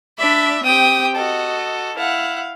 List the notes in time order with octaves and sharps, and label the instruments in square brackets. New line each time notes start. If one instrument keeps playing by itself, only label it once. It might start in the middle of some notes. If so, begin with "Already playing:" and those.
[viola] D4 E5 [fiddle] D5 B5
[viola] C4 G5 [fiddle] G4 D#6
[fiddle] F#4 A4 [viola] D#5
[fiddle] E4 F#5 [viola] F5